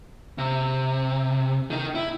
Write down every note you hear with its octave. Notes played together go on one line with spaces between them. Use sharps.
C3
D#3 D#4
E4